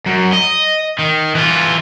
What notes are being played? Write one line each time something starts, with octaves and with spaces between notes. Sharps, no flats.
F#2
D#5
D#3
E3 F4